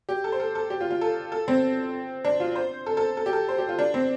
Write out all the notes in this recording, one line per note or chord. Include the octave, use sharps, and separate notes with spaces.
G4
A4
C5
A4
A4
G4
F4
F4
A4
A4
C4
D4
F4
C5
A4
A4
A4
G4
A4
C5
G4
F4
D4
C4